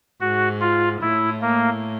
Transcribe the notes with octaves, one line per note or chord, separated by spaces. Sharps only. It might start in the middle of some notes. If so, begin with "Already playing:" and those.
G#2 F#4
F4
A2 E4
A#3